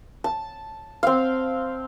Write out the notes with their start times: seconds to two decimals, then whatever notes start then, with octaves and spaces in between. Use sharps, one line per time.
0.24 A5
1.03 C4 F5